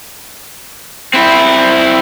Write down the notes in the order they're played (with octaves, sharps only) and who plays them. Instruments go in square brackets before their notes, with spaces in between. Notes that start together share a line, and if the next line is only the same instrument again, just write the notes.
[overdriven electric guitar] C4 E4